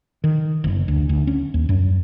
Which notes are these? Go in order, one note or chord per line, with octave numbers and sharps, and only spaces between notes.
D#3
F#1
D2
D2
C#4
D#2
F#2